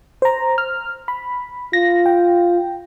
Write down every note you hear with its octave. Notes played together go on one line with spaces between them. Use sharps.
C5 A#5
F6
B5
F4 A#6
G5